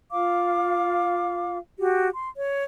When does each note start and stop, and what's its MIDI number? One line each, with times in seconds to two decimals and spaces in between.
0.12 1.58 65
0.12 1.58 77
0.12 1.58 86
1.78 2.09 66
1.78 2.09 67
2.15 2.30 84
2.37 2.63 73